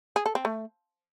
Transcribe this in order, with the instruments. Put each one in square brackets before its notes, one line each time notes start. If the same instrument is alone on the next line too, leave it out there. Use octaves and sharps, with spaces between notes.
[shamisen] G#4
A4
C4
A3